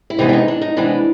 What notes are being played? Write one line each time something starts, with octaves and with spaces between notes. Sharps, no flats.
E4
C3 E3 G#3 B3 D#4
D4
D#4
D4
D#4
C3 E3 G#3 B3 D4